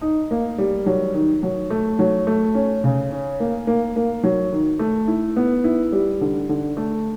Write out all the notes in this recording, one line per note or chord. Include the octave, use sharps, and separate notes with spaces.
D#4
A#3
G3
F#3
D#3
F#3
A3
F#3
A3
C#4
C#3
C#4
A#3
A#3
A#3
F#3
D#3
A3
E4
B3
E4
G3
D3
D3
A3